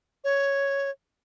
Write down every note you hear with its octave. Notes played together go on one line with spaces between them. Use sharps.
C#5